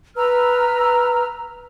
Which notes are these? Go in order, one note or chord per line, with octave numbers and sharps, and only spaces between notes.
B4 A#5 E6 F6